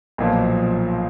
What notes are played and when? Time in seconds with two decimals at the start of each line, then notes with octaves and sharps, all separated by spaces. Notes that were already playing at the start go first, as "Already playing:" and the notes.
0.18 B1 A#2 F3